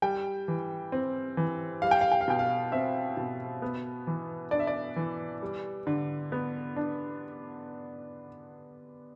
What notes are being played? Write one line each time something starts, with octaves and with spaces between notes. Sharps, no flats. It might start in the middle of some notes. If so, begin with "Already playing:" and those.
G3 G5
E3
C4
E3
G3 F5
G5
F5
G5
F5
B2 G5
F5
C4 E5
B2
B3
E3
D4 D5
E5
D5
E3
G3
D3
B3
D4